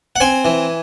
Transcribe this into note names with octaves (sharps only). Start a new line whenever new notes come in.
F#5
C4 G#5
E3